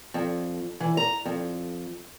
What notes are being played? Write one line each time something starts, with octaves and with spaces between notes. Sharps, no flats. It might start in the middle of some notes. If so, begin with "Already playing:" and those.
F2
E3
A#5
F2